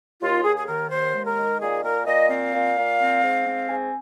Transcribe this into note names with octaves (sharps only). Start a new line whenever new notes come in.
D#2 F4
D#2 G#4
G#4
D#3 A#4
D#2 C5
G#3
A#4
D#3
A#2 G#4
A#2 A#4
A#2 D#5
C4 F5
A#2
A#2
C4
G#2
C4
G#2 G#5